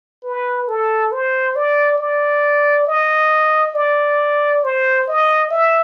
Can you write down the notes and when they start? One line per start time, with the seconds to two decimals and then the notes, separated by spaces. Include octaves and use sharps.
0.24 B4
0.68 A4
1.12 C5
1.56 D5
1.99 D5
2.87 D#5
3.75 D5
4.64 C5
5.07 D#5
5.51 E5